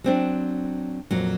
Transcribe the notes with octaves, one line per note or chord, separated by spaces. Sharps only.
F#3 C4 D4
F2 A#2 F#3